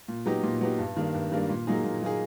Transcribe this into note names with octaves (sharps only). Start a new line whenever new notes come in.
A#2
F#3 B3 D#4 G4
A#2
F#3 B3 D#4 G4
G2
D#3 G3 A#3 D4
G2
D#3 G3 A#3 D4
A#2
F#3 A#3 D#4 G#4
A#2
F#3 A#3 D#4 G#4